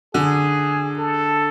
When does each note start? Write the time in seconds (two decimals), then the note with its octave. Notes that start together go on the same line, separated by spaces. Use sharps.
0.14 D3 G#4
0.98 A4